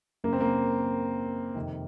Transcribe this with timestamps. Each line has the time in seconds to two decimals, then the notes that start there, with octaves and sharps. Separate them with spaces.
0.24 F#2 C#3 A#3
0.33 C4
0.41 A#3
1.55 F2 C3 D#3